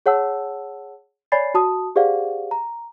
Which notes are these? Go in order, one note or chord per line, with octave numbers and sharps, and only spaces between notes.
G#4 C#5 F#5 A5 E6
C#5 D5 G#5 B5 A6 C7
F#4 A5 D#6
G4 G#4 C5 D5 F5 F#5
A#5